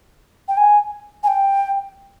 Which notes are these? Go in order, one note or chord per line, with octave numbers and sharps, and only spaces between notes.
G5
G#5
G#5
G5